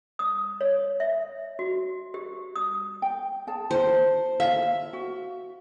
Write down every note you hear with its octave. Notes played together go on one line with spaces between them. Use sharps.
D#6
C#5
E5
F#4
G4
D#6
G5
G#4 A5
C5
E5 F5
F#4